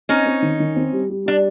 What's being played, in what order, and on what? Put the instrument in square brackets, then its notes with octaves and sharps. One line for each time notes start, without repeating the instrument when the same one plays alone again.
[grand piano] C4 [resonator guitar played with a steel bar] C#4 D#4
[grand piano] C4
D#3
D#3
C4
G3
G3
[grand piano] G3 [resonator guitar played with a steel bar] D4